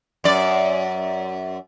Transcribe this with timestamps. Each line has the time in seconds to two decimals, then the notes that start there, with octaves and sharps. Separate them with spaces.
0.24 F#2 D5